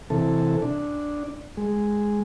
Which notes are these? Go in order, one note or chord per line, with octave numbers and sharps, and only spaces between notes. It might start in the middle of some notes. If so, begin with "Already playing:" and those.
C3 E3 A4
D4
G#3